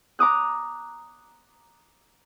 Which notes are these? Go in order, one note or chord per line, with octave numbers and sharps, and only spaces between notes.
A#5 D6 D#6 F#6